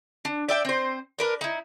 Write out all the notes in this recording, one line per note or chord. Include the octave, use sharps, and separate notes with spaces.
D4
D5 E5 G5
C4 C5
D4 A#4 B4
D#4 E4